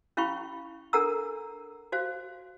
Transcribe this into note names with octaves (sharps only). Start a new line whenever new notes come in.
C#4 E4 F5 G5 B5 C#6
D4 A4 A#4 F#5 A#5 E6
F#4 C5 F5